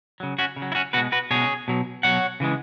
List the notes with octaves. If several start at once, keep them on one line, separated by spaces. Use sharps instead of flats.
C#3 F#3
C#4 F#4
C#3
F#3
E4
C#4 F#4
B2 G#3 F#4 B4
F#4 B4
B2 G#3 G#4 C#5
B2 F#3
B2 F#3 C#5 F#5
C#3 E3 G#3